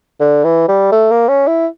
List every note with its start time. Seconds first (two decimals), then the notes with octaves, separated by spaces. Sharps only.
0.20 D3
0.44 E3
0.68 G3
0.92 A3
1.11 A#3
1.29 C#4
1.47 E4